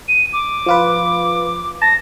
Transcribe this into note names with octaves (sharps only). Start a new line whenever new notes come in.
D#7
D6
F3 F4 B4
A5 A#6